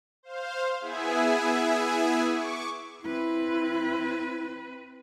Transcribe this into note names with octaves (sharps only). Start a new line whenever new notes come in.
C5 F5
B3 E4 G#4 E5 G#5
C#6 D6
C4 E4 B4